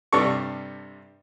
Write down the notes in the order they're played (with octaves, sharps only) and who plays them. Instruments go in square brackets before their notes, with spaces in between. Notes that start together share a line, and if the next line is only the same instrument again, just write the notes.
[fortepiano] G2 C3 G3 A4 C#6